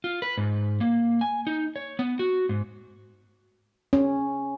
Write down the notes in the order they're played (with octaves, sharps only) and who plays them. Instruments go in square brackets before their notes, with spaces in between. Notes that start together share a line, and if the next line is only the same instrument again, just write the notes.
[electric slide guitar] F4
B4
G#2
A#3
G#5
D#4
C#5
B3
F#4
G#2
[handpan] C#4